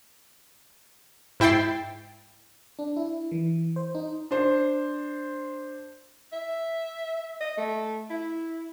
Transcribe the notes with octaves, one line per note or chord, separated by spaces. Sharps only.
G#2 E4 G5 A6 C7
D4
E4
E3
C5
D#4
D4 C5
E5
D#5
A3
E4